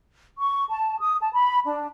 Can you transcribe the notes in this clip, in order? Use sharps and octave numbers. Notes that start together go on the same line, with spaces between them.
C#6
A5
D#6
A5
B5
D4